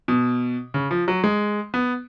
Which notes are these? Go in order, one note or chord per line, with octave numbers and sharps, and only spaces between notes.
B2
C#3
F3
F#3
G#3
B3